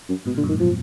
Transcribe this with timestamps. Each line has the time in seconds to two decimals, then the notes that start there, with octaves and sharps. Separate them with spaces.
0.09 F#2
0.26 G#2 B2
0.35 A#2
0.37 D3
0.43 F#2
0.49 D#3
0.52 G#2
0.60 B2 F3